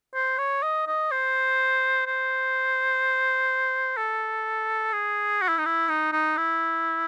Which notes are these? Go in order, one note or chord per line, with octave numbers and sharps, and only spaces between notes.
C5
C#5
D#5
D#5
C5
C5
A4
G#4
F#4
E4
D#4
E4
D#4
D#4
E4